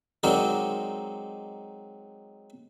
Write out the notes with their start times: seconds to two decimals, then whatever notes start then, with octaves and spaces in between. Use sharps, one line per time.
0.23 F#3 G#3 C4 D#4 A#4 D5